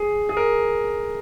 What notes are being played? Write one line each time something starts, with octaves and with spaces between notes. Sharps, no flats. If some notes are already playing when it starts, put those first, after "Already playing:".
Already playing: G#4
G#4
A#4